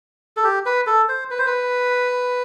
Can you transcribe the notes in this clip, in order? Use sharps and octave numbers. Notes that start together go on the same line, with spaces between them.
A4
G4
B4
A4
C5
B4
C5
B4